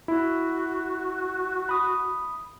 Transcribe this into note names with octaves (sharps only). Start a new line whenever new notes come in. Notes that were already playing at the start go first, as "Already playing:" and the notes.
E4 F#4
B5 D#6